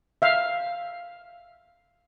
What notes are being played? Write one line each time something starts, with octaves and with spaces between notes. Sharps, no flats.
E5 F5